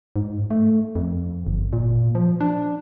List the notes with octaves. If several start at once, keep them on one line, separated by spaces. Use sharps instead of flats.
G#2
A3
F2
G1
A#2
F3
D4